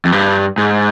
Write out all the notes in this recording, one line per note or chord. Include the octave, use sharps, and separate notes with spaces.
F2
G2
G#2